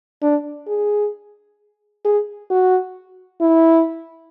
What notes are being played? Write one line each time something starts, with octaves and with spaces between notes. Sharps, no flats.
D4
G#4
G#4
F#4
E4